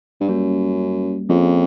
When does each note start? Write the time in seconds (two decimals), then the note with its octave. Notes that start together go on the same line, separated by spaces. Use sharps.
0.21 G2
0.28 F#2 G3 A#3 C#4
1.29 F2 F3 A#3 C#4 F4 G#4